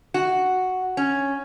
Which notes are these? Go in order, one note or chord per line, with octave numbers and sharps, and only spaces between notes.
F#4
C#4